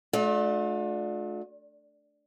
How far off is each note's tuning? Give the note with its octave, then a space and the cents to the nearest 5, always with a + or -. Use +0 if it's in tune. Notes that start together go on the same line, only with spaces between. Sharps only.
A3 -40 D4 +5 F4 +40